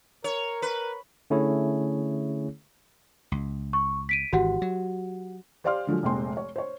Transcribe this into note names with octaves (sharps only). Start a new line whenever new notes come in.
A#4 C#5
B4
D3 A3 C#4 E4 G#4 C#5
C#2
C#6
B6 D7 D#7
G#1 E3 F#4 G4 F#5
F#3
G4 C5 D5 F5 C6 F6
D3 F3 F#3 G#3
F1 A#1 C3 G#3 G5 C6
C#5
C5 C#5